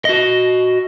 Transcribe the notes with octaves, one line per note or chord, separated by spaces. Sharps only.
F#4 D#5